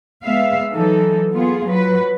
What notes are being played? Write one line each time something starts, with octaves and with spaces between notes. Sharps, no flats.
G#3 B3 E5 F5
E3 F#3 D#4 A4
B3 F4 G#4
F#3 B4